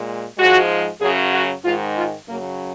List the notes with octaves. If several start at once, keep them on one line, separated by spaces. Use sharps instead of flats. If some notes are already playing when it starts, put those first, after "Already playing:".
Already playing: A#2 G#3
G#2 F3 G#3 F#4
F#2 C#3 F#3 G#4
F#4
G#2 D#3 G#3 F4
F4
F#2 C#3 F#3 A#3